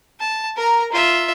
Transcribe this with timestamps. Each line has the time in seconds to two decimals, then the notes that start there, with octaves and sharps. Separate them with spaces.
0.20 A5
0.57 A#4 A#5
0.92 F4 E5